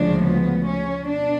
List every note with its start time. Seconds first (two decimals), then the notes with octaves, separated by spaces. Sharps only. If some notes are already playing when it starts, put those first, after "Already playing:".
Already playing: D2 C#3 F3 G#3 D4
0.24 B3
0.66 C#4
1.08 B2 D4